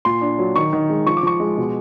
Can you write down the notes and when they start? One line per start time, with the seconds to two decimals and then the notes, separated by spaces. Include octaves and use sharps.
0.05 A#2 C6
0.21 D4
0.39 F#3
0.56 D#3 C#6
0.73 D#3
0.90 G#3
1.06 F3 C#6
1.17 D6
1.23 F3 C#6
1.40 G#3
1.57 B2